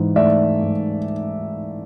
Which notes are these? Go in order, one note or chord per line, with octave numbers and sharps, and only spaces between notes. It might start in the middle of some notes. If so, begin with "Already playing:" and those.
Already playing: G#2 E3
A3 D5 E5
G#2